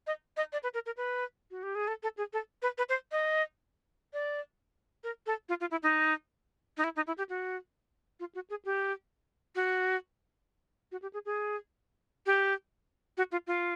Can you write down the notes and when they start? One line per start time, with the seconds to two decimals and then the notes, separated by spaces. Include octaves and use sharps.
0.07 D#5
0.37 D#5
0.53 D5
0.63 B4
0.74 A#4
0.86 A#4
0.97 B4
1.51 F#4
1.63 G4
1.75 G#4
1.88 A4
2.03 A4
2.18 G#4
2.33 A4
2.62 B4
2.78 B4
2.89 C5
3.12 D#5
4.13 D5
5.04 A#4
5.26 A4
5.49 F4
5.61 F4
5.71 E4
5.83 D#4
6.77 D#4
6.84 E4
6.96 D#4
7.07 E4
7.18 G4
7.29 F#4
8.20 F4
8.35 F#4
8.50 G#4
8.65 G4
9.55 F#4
10.92 F#4
11.02 G4
11.13 G#4
11.25 G#4
12.26 G4
13.17 F#4
13.32 F4
13.47 F4